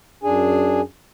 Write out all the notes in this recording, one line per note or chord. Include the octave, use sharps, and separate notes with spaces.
F#2 D4 G#4 G#5